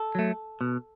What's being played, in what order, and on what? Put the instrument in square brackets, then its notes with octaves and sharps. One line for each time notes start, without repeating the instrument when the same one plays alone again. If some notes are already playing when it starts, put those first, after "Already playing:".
Already playing: [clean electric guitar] A4
F#3 A3
B2